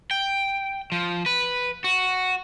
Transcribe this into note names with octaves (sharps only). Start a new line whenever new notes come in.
G5
F3
B4
F#4